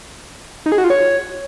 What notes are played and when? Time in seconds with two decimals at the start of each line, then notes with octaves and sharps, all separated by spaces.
0.66 D#4
0.72 G#4
0.78 F#4
0.84 F4
0.90 C#5